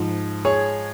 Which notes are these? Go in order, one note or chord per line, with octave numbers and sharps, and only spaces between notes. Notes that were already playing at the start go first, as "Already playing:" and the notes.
Already playing: G#2 F3
G#4 C#5